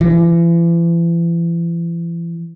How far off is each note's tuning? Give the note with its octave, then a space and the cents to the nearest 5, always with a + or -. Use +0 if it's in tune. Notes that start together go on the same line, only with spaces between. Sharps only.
E3 +40